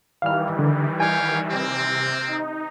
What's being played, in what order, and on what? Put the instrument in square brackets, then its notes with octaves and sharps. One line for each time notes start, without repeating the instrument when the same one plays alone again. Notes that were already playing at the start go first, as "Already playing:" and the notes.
[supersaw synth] D#3 E3 G3 [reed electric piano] F5 F6
[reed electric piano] D3
[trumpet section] C#5 F5 G5 [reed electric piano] G#5
[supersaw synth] C3 [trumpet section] A#3 C4
[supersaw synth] D#4